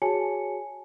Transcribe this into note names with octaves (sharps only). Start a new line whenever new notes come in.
F#4 G#4 C#5 G#5 A5 C#7